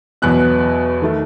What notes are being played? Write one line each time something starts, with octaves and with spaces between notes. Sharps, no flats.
E2 B2 F#3 B3 F#6
D#3 A3